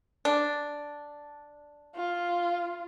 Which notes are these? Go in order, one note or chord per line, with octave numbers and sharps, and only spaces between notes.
D4
F4